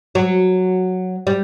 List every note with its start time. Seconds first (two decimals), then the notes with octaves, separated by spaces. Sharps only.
0.15 F#3
1.27 G3